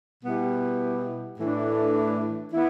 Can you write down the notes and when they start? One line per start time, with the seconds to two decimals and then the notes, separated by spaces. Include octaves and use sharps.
0.24 B2 G3 B3 E4 G4
1.39 A2 E3 A3 D4
2.54 E3 B3 E4